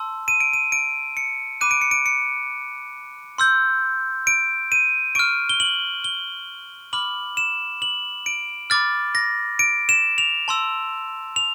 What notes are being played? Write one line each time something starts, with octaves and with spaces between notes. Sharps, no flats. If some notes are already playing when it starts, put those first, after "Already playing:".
Already playing: A5 C6 E6
D#7
D7
D#7
D7
C#7
B5 D6 F#6 D#7
D7
C#7
D7
C#7
C6 E6 G6
D7
D#7
C#6 F6 D7
G7
F#7
G7
B5 D6 F6 F#7
E7
F#7
D7
B5 D6 F6 A6
A#6
D7
E7
F7
A5 C6 E6
F7